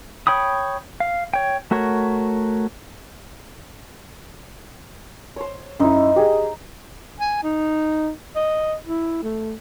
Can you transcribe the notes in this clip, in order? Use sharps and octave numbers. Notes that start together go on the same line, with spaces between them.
C#5 G5 B5 D#6
F5
C#5 G5
A3 F#4 A#4 C#5
C5 C#5
F#2 D#4 E4 C5
G4 G#4
G#5
D#4
D#5
E4
A3